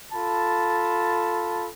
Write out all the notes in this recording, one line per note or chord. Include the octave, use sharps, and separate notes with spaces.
F4 A4 A5 B5